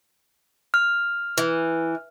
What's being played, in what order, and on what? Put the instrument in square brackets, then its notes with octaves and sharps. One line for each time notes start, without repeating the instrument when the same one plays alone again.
[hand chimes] F6
[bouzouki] E3